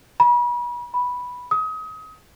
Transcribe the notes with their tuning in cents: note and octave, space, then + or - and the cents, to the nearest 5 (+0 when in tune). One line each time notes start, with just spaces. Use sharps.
B5 -35
B5 -5
D#6 +30